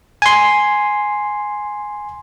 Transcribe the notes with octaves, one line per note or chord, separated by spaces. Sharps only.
G#5 C6